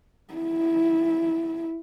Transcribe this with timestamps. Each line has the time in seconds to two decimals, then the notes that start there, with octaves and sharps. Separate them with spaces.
0.34 E4